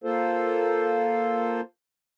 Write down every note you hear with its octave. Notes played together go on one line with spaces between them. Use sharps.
A#3 F4 A4 C5